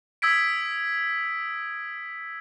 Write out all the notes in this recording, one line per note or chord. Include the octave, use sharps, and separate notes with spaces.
D#6 E6 G#6 B6 D7